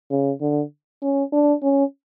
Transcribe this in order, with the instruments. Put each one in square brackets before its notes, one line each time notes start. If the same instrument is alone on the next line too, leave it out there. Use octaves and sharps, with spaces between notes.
[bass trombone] C#3
D3
C#4
D4
C#4